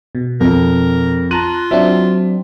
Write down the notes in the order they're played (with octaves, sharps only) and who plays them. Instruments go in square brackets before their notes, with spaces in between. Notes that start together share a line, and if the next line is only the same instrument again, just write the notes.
[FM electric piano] B2
[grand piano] F2 [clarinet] A#4
[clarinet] F4 [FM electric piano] A5 A#5 F#6 [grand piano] D#7
[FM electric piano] F#3 C4 D4 [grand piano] E5